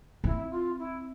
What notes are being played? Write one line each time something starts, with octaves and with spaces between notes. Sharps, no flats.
C4 E4
F4
E4